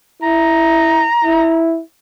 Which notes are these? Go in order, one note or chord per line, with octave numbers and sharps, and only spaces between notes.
E4 A#5
E4